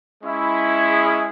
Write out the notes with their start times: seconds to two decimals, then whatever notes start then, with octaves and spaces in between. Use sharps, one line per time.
0.22 G#3 C#4 E4
0.91 G#4